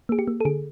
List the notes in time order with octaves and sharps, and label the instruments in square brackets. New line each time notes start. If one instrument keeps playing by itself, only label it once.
[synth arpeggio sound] A#3 G#4
G4
A#3
A4
D3 G#4